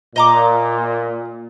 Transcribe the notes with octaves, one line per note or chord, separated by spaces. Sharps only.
A#2 D#5 A#5 D6